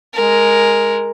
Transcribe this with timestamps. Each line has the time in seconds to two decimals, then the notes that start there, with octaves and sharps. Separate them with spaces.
0.14 G#3 A#4